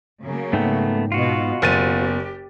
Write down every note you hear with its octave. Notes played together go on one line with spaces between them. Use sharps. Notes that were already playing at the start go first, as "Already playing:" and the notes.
C#3 F#3 A#3
G#2 A3 B3 D#4 G5
B2 B3 F4 F#4
F#1 B3 G4 C5 A6 D#7